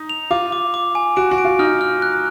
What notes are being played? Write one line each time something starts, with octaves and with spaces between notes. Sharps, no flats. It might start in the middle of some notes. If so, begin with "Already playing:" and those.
Already playing: D#4
F7
F4 D6
D6
D6
G#5
F#4 D7
F#4
D7
F4
D#4 F6
F6
F#6